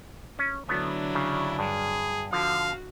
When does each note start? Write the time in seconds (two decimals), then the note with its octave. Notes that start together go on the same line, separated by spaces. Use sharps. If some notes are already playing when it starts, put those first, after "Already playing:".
0.39 C#4
0.69 D3 F#3 A3 B3 D4 E4
1.15 C#3
1.59 G2 G#4
2.32 D3 F3 F#4 F5